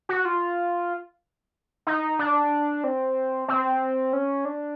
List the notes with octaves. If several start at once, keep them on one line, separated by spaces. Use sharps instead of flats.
F#4
F4
D#4
D4
C4
C4
C#4
D4